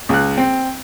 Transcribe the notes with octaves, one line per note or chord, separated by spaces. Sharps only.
C#2 F#6
C4